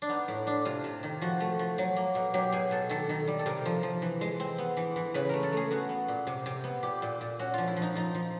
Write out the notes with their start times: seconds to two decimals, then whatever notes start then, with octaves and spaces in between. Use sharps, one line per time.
0.02 D4
0.09 B3 D#4
0.28 A2 E4
0.47 D4
0.65 C3 F4
0.84 C3
1.03 D#3
1.22 F3 F#4
1.40 A3
1.59 F3
1.78 F#3
1.96 A#3
2.15 B2
2.34 F#3 G4
2.52 B2 G#4
2.71 B2 A4
2.90 D#3 A4
3.09 D#3
3.28 G3
3.39 A4
3.46 C3 A#4
3.66 F3
3.83 F3
4.02 E3
4.21 G#3
4.40 C4
4.58 B3
4.77 E3
4.96 E3
5.14 C#3 B4
5.29 A3 A#4
5.43 A4
5.53 A3 G#4
5.71 B3 F#4
5.89 B3
6.08 A#2
6.27 C3
6.46 C3
6.64 B3
6.83 A#2 G4
7.02 A#2
7.21 A#2
7.39 C#4 F#4
7.54 F3 F4
7.68 E4
7.77 F3
7.82 D#4
7.96 F3 D#4
8.15 F3